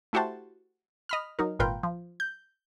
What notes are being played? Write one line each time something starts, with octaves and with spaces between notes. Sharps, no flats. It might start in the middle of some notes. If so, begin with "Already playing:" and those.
A3 E4 F#4 G4 C5 A5
D#5 B5 F6
F#3 D#4 A#4
G#1 A#2 F4 A#4 B4 G5
F3
G6